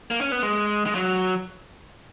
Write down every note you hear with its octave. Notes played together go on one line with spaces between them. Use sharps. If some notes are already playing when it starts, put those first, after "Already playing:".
A#3
C#4
B3
G#3
G#3
F#3